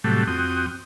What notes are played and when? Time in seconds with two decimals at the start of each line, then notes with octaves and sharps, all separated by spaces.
0.04 A2 C3 F#3 G3 A3
0.27 F2 C4 F#4 G5 D#6